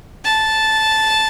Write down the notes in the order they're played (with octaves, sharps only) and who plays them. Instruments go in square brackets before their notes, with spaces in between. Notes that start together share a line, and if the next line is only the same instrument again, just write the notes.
[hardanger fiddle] A5